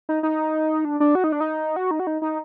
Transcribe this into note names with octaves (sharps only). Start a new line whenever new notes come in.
D#4
D#4
D4
D4
F#4
D#4
D4
D#4
F#4
D#4
F#4
D#4
D#4